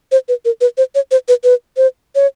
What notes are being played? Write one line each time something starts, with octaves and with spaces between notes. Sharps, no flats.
C5
B4
A#4
B4
C5
C#5
C5
B4
B4
C5
C#5